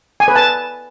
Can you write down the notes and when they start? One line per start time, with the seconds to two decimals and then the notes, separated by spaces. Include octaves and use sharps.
0.20 G#5
0.28 B4
0.36 A5